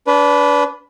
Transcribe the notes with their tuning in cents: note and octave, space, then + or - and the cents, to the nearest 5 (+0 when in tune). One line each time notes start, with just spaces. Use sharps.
D4 -25 B4 +0